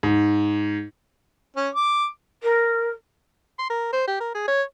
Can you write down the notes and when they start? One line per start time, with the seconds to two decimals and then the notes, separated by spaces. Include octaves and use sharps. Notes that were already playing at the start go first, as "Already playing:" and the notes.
0.03 G#2
1.57 C#4
1.75 D6
2.42 A#4
3.59 C6
3.70 A#4
3.93 C5
4.08 G4
4.20 A#4
4.35 G#4
4.48 C#5